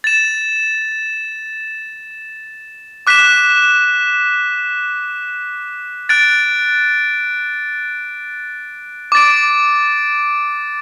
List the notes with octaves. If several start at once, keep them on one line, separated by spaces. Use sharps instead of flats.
A6 E7
D6 F#6 B6 E7
F#6 A6 D7
D6 A6 D7